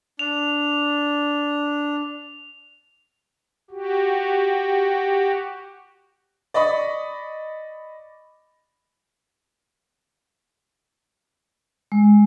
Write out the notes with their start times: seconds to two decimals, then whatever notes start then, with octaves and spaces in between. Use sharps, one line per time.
0.19 D4 F7
3.71 F#4 G4
6.54 D5 D#5 B5 C#6
11.92 G#3